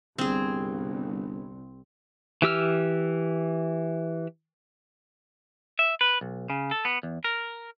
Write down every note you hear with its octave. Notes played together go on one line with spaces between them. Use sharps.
G1 C2 C4 G#4
E3 G4 E6 F6
E5
B4
B1
C#3
A4
B3
E2
A#4